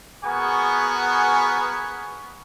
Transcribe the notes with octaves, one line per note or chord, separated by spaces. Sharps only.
B3 F#4 G#4 A#4 G#5 C#6